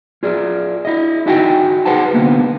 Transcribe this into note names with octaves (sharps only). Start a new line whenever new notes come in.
F4 G#4 D5
E4 D#5
D#4 F#4 D#5 E5 G5 G#5
G#4 B4 C5 F#5 A5
C2 D3 A#3 B3